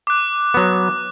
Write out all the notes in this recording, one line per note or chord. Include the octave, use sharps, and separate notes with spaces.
D6 F#6
F#3 B3